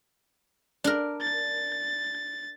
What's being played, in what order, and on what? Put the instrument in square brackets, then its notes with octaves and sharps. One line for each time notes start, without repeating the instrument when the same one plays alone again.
[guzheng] D4 A#4
[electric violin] A6